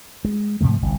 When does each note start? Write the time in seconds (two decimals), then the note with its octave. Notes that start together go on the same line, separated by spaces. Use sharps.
0.25 G#3
0.61 G#2 C3 F3 A3
0.82 G1 C2